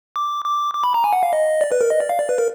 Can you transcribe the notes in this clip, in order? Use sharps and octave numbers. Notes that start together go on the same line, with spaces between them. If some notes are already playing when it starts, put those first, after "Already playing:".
D6
D6
D6
B5
A#5
G#5
F#5
F5
D#5
D5
B4
A#4
D#5
D5
F5
D5
B4
A#4